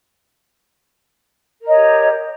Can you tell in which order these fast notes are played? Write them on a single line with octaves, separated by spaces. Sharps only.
A#4 D#5 C#5 G4